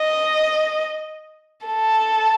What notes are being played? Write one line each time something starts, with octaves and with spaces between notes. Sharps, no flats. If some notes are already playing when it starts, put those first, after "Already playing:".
Already playing: D#5
A4